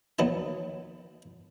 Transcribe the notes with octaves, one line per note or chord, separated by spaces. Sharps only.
D#2 F#3 B3 D#4 A5